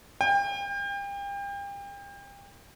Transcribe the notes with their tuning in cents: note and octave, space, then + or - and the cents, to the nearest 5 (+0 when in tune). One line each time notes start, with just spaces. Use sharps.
G5 +35